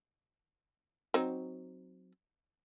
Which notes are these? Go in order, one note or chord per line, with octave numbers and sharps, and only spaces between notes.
F#3 C4 D#4